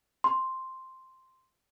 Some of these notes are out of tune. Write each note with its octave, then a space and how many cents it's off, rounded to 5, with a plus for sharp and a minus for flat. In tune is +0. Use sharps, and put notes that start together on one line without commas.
C6 +0